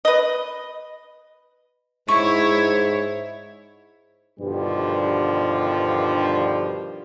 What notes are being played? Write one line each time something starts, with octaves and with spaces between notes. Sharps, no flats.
B4 D#5
G#2 E4 C#5 C#6
G2 B2 D3 D#3 F3 G3